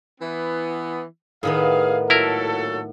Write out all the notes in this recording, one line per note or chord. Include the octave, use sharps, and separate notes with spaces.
E3 B3
A2 D#3 B3 G#4 F5
A#2 F#3 E4 A4 A#4